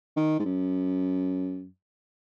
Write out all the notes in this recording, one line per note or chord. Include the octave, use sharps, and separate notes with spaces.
D#3
G#2
F#2